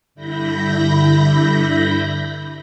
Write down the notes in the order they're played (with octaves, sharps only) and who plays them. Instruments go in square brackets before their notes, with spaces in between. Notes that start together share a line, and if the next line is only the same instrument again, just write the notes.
[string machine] G2 D3 E4 B5 G6 A#6